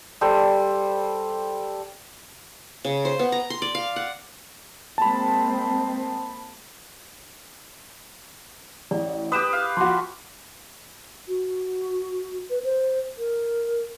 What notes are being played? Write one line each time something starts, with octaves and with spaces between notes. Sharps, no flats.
G3 A4 C5
C#3
C5
B3
A#5
C6
D5
F5
F#5
G#3 A#3 C4 A5 B5
A1 D5
G4 B4 D#6 F#6 E7
F5
F3 F#4 C6 D6
F#4
B4
C5
A#4